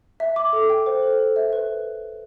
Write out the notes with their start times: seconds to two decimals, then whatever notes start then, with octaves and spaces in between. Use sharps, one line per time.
0.20 E5
0.36 D6
0.53 A4
0.70 G5
0.86 C5
1.03 A4
1.19 A4
1.36 E5
1.53 B4